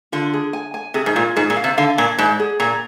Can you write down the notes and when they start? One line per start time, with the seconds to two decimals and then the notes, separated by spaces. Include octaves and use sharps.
0.12 D3 F4
0.33 G#4
0.53 G#5
0.74 G#5
0.94 C3 G#4
1.06 G#2
1.16 A#2 F4
1.36 G#2 G#4
1.50 A#2
1.56 F5
1.64 C3
1.77 D3 F5
1.98 A#2 D5
2.18 G#2 D5
2.40 G#4
2.60 A#2 A#5